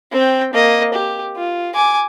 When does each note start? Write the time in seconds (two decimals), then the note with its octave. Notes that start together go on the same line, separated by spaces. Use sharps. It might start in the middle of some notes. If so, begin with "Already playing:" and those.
0.12 C4 G5
0.53 A#3 D#5
0.94 G4
1.37 F4
1.74 G#5 D6